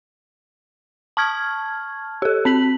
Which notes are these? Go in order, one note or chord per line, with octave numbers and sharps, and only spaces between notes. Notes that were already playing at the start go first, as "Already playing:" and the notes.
A5 C#6 F6 G#6
G4 A4
C4 B6 F#7